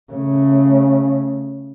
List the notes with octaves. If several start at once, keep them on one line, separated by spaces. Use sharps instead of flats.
C#3 A3